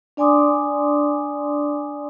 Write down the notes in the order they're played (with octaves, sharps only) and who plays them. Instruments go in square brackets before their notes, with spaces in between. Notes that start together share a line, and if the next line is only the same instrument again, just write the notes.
[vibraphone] D4 D5 G#5 C6 D6 D#6